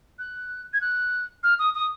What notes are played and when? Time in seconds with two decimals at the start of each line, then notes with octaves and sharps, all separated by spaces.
0.19 F#6
0.73 G#6
0.81 F#6
1.43 F6
1.59 D#6
1.75 D#6